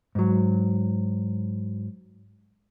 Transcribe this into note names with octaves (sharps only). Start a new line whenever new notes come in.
G#2 F#3